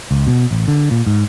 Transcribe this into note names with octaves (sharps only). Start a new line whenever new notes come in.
C#2
B2
A1
D3
A#2
G#2